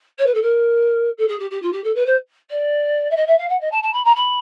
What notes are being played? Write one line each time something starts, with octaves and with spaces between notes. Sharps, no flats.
C#5
B4
A4
A#4
A4
G#4
G4
G4
F4
G4
A4
B4
C5
D5
E5
D#5
E5
F5
F#5
D#5
A5
A5
B5
A#5
B5